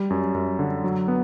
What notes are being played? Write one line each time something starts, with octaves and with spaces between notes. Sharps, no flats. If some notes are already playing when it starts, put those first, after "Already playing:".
Already playing: G3
F#2
F#2
D3
F#3
B3